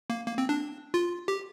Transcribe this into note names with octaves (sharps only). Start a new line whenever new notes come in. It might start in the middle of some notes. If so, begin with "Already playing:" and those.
A#3
A#3
C4
D4
F4
G4